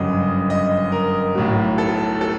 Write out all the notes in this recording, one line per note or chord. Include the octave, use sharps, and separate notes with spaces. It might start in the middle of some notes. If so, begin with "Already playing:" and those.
Already playing: G1 F#2 C#3 D#5
D#5
A#4
B1 A2 F#3
A4
A4